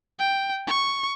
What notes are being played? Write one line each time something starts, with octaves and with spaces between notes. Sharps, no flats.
G5
C#6